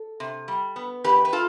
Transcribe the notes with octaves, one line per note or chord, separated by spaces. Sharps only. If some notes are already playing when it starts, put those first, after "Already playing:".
Already playing: A4
C3
G3
B3
E2 G4 B4
B4
F4 A4